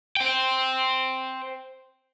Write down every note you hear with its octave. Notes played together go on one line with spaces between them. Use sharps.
C5 G5